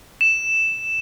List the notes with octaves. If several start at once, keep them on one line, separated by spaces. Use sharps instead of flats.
E7